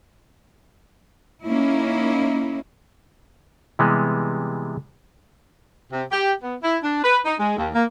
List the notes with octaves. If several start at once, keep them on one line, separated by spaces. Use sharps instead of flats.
A#3 C#4 D#4 E4
C3 E3 G3 G#3 B3
C3
G4
B3
E4
D4
B4
D#4
G#3
D#2
A#3